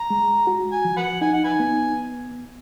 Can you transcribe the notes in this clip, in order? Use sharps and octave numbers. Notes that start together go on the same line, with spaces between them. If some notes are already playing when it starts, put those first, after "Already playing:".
Already playing: A#5
G#3
F#4
G#5
F3
B4 F#5
D#4 G#5
F#5
B4 G#5
B3